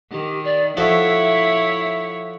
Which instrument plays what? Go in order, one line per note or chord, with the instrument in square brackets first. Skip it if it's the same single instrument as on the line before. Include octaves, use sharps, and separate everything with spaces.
[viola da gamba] D#3 [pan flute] G4
[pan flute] D5
[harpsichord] F3 F#4 A4 [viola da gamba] E4 C#5 [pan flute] E5